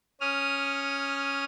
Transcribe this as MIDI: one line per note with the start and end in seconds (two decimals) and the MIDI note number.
0.21 1.45 61
0.21 1.45 87
0.21 1.45 89